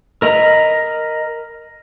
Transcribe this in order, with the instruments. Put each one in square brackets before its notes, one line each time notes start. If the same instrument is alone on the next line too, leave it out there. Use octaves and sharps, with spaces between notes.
[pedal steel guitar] A#4 D#5 A#5 B5